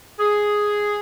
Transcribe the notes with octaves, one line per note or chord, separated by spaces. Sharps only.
G#4